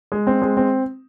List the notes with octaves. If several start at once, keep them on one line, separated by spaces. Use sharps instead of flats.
G#3
C4
G#3
C4